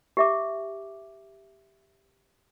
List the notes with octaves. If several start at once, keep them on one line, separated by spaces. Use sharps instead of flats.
G4 E5 D6